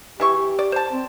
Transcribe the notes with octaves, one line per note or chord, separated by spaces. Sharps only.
E3 E4 G4 C#6
G4
D5
C5 A5
C4